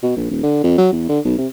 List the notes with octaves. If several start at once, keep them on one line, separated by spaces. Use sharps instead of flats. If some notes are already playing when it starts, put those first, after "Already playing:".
B2
A#1
D#1
D3
F2
F#3
E2
D3
B1
C3